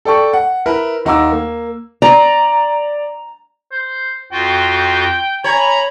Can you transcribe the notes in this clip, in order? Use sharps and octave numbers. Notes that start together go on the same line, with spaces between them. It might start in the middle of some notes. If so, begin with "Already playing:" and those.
A4 D5 G5 C#6
F#5
E4 A#4 B4
D#2 D#4 F#5 A#5 D6 E6
A#3
D5 A#5
C5
F2 F4 F#4 G5
C#5 G#5 A#5 B5